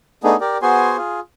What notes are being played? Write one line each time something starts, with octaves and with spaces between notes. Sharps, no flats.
A3 B3 D4 D#4 G#4
G4 A#4 D5
B3 F#4 G#4 C5 G#5 C6
F4 G#4